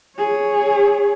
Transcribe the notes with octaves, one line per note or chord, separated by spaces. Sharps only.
G#4 C#5